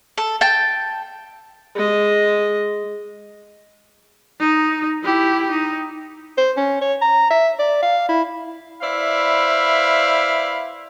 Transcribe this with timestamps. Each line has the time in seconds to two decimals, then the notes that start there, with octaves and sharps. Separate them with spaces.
0.18 A4
0.41 G5 A5
1.76 G#3 D#5
4.40 D#4
5.03 E4 G4
5.51 D#4
6.37 C5
6.57 C#4
6.81 C#5
7.01 A#5
7.30 E5
7.59 D5
7.82 F5
8.09 E4
8.82 E4 B4 C5 D5 E5 F5